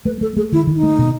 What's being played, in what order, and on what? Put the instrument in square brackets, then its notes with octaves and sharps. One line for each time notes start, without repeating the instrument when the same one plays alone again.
[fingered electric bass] A3 [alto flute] B4
[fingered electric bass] A3 [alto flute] A4
[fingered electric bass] A3 [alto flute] G#4
[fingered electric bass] D#3 [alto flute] E4
[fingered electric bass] D#3
[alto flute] D#4
[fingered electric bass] A3
B2